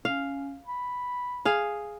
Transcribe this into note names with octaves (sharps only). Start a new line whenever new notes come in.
C#4 F5
B5
G#4 F5